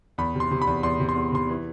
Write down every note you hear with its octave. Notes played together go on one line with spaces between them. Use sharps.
E2 B5
C3
C6
C3
B5
E2
E2 C6
C3
C6
E2
C3 C6
E3